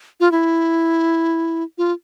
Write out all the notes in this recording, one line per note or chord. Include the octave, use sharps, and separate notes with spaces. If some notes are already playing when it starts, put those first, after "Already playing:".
F4
E4
F4